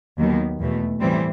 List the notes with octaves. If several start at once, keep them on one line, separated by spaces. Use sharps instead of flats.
D#2 D#3 F#3 B3
E2 B2 A3
A2 E3 G3 C4